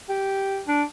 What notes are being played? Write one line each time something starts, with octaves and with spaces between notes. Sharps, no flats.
G4
D4